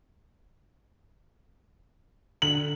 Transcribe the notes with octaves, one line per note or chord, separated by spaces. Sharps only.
D3 F#7